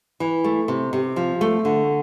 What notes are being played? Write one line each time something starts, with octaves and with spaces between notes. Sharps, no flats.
E3
A3
C3
C3
F3
A3
D3